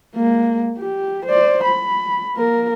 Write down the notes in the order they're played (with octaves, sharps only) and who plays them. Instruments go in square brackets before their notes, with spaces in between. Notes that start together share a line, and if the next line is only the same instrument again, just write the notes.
[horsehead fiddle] G#3 A#3
G4
C5 D5
B5
A#3 A#4